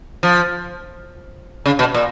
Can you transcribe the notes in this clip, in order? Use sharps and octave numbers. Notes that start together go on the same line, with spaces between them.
F3
C#3
B2
A#2